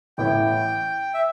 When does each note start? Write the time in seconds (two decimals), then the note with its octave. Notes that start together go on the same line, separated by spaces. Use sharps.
0.18 A1 A2 E3 B3 E4 G5
1.14 E5